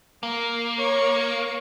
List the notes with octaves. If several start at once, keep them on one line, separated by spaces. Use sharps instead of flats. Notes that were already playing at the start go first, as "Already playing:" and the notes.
A#3
C#5